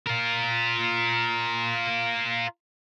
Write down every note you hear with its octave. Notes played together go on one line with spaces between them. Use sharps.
F4 A#4